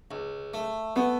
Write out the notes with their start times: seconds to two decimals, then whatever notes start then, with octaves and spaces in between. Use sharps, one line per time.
0.11 C#2
0.54 A3
0.96 A3 B3